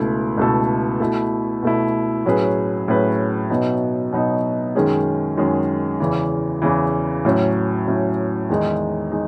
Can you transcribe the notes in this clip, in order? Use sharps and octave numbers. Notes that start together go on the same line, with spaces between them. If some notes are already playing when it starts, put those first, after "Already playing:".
Already playing: C#2 B2 A3 E4 A4
C#2 B2 A3 E4 A4
B2 A3 E4
B2 A3 E4
A2 F#3 C#4 G#4 B4
A2 F#3 C#4 G#4 B4
B2 F#3 B3 D#4
B2 F#3 B3 D#4
F#2 D#3 G#3 C#4 G#4
F#2 D#3 G#3 C#4 G#4
E2 C#3 E3
E2 C#3 E3
A2 F#3 C#4
A2 F#3 C#4
E2 D#3 G#3 D#4
G#3 D#4